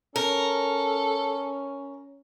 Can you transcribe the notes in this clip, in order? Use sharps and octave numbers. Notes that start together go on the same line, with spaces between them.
C#4 A4 A#4